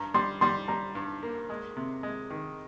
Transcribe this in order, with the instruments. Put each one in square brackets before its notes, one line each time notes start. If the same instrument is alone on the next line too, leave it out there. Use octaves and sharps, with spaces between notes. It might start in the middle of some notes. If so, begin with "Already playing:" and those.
Already playing: [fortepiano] G2 [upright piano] A#5
[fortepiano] G3 [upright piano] C6
[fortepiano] G3 [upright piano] C6
[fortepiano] G3 [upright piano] A#5
[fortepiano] G2
A#3
G#3
C3
G#3
D#3